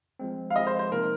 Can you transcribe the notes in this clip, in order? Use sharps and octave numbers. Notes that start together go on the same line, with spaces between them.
F3 G#3 C4
F5
F3 G#3 C4 D#5
C5
C5
C3 F3 A#3 D#4 A#4